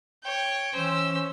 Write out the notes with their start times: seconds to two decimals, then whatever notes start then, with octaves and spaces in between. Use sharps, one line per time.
0.23 C#5 G5
0.74 E3 C#4 C5 E6